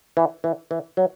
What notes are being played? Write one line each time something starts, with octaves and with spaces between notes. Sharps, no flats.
E3
E3
E3
F#3